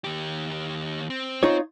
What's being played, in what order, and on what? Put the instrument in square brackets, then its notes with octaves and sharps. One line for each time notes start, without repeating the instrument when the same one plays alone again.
[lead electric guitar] D#2 G4
C4
[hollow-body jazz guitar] D#4 F4 C#5